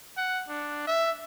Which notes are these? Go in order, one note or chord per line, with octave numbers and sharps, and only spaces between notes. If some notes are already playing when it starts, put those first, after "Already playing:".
F#5
D4
E5